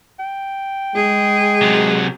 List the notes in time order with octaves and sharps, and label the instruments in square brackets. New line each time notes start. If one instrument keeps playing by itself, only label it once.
[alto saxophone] G5
[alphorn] G#3 [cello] G#4
[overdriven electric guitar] C3 F#3